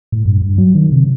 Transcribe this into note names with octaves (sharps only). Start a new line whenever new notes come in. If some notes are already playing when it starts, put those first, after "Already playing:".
A2
G2
G2
F#3
D#3
C3